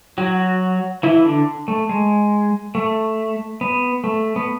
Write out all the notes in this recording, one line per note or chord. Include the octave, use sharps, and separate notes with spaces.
F#3 F#4
E3 E4
D3 D4
A3
G#3
A3
B3
A3
B3